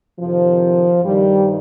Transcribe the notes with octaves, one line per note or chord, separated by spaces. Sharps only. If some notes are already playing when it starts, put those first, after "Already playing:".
F2 C3 D#3 F3
G2 D#3 G3